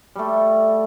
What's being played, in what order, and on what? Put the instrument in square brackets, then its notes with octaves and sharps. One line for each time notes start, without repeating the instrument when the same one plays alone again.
[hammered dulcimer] G3 A3